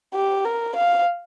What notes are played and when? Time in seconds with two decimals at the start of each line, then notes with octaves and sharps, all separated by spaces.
0.14 G4
0.45 A#4
0.76 F5